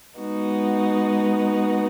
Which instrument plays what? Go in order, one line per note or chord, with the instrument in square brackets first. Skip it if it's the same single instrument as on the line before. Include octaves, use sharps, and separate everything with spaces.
[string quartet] G#3 B3 D#4 F#4